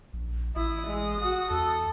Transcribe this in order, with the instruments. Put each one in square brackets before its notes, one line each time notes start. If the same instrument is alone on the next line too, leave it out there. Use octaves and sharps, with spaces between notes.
[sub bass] A#1
[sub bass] A1 [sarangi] E4 [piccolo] D#6
[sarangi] G#3
F#4
[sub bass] E2 [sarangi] A4